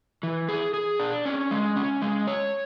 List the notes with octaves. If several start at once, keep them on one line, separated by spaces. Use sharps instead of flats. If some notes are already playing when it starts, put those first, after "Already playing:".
E3
G#4
G#4
D4
C#4
G#3
C#4
G#3
C#5